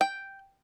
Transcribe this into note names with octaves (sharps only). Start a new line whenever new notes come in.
G5